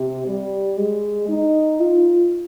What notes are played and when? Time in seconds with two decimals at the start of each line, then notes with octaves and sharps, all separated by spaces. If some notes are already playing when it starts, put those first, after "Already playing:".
Already playing: C3
0.27 G3
0.77 G#3
1.29 D#4
1.80 F4